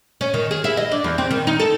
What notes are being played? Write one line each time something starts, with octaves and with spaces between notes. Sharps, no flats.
C#4
D#3
G#4
E4
D#5
D4
E2
C4
D#3
D#4
A4